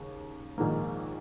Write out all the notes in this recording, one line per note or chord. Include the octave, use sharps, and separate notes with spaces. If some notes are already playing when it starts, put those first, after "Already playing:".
Already playing: D#2 C#3
A#1 G#2 D#3 A#3